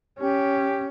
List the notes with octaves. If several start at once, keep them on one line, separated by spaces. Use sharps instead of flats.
C#4 G4